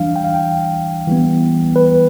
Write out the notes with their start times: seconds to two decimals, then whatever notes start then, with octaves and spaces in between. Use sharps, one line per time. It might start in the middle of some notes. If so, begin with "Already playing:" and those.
Already playing: E3 G3 D4 F5
0.16 G5
0.24 F5
0.34 G5
1.07 E3 G3 B3
1.76 B4